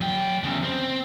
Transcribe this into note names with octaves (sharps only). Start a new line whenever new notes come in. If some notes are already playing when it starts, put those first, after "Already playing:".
F#3 G5
E2 C#3
C4